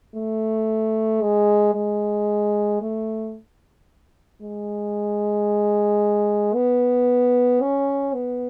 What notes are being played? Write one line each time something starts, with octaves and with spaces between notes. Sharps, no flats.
A3
G#3
G#3
A3
G#3
B3
C#4
B3